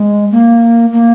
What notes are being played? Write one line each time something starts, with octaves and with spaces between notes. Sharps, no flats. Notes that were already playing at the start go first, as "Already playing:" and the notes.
Already playing: G#3
A#3
A#3